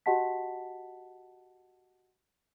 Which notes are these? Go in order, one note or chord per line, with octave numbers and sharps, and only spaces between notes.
F#4 G4 D#5 F#5 A5 B6